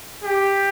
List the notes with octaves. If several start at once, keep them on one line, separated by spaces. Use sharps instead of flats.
G4